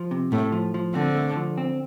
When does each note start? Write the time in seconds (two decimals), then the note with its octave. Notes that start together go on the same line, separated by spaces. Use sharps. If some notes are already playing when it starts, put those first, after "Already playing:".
Already playing: F3
0.11 C3
0.32 A2 A3
0.52 F3
0.74 F3
0.94 D3 C4
1.15 A3
1.36 F3
1.58 C4